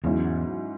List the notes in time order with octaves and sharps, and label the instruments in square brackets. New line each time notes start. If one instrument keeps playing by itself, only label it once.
[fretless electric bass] E2 [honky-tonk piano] G#2 F#3 C#4 E4